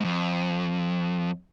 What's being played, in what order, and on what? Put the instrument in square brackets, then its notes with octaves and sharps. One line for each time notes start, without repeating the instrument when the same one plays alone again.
[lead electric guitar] F2 G#2